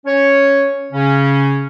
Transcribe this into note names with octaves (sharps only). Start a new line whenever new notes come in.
C#4 C#5
C#3 C#4